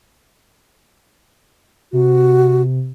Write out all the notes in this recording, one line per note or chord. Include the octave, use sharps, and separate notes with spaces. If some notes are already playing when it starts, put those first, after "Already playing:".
C3 F#4